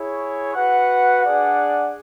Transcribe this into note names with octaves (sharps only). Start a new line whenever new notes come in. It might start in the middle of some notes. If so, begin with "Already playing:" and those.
Already playing: E4 G#4 C#5
F#4 B4 F#5
D4 G#4 D5 F#5